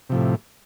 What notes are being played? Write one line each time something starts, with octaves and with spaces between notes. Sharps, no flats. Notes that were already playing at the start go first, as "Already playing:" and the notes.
A2 C3 F3